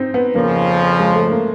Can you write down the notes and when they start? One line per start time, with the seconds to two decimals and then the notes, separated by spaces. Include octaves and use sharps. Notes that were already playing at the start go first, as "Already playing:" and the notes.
Already playing: C4 D#4
0.14 B3
0.35 F2 C#3 F3 A#3
0.99 G#3
1.15 A3
1.31 A#3